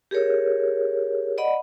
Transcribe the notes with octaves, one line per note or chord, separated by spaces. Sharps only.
G4 G#4 A#4 C#5
D5 D#5 F#5 B5